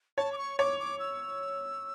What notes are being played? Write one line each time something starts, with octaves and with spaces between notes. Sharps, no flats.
C#5 A5
D6
C#6
C#5 D6
D6
E6